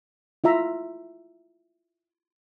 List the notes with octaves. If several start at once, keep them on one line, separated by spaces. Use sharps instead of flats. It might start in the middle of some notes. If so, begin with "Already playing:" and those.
E4 F4 E5 A#5